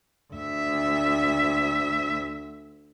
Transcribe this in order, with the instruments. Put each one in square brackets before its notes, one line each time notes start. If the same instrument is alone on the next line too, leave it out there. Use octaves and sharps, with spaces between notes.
[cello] D2 E5